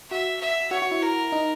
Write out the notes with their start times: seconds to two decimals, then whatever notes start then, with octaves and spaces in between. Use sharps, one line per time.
0.10 F#4 E5
0.41 E5
0.71 F#4 C#5
0.82 F#4
0.91 E4
1.02 A#4
1.32 D#4